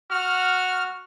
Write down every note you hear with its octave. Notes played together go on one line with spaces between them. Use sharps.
F#4 F6